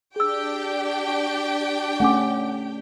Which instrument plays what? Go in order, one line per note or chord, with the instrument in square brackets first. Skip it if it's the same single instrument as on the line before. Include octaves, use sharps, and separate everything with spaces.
[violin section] D4 G4 G5 [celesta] G#4 E6
[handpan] A3 C#4 [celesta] F#5 G#5 D6